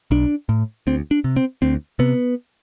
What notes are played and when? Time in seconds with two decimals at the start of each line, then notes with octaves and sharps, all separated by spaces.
0.11 B1 D4
0.49 A2
0.87 D2 C4
1.11 D4
1.24 C3
1.36 C4
1.62 D2 C4
1.99 C3 B3